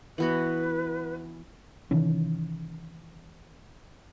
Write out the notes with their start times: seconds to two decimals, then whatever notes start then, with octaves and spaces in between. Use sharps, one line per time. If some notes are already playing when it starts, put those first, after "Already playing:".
0.18 E3 B3 F#4 B4
1.91 C3 D#3 E3 C#4